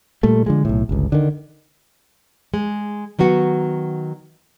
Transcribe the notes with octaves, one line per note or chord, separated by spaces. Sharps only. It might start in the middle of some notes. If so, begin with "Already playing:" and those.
A#2 G3 A3
D3 F3 G#3
B1 A2
G1 C#2
D3 D#3
G#3
D#3 F#3 B3 F#4